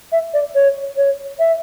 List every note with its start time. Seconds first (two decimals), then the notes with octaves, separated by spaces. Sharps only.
0.12 E5
0.34 D5
0.55 C#5
0.97 C#5
1.39 E5